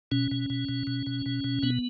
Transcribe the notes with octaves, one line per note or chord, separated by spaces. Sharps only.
B2 C#4
B2
B2
B2
B2
B2
B2
B2
B2 B3